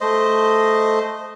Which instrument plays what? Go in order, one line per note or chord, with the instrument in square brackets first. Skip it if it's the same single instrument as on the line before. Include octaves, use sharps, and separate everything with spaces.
[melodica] A3 C5 D#5